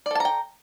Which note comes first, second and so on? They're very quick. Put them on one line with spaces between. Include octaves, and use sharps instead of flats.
D5 A4 A5 A#5 G5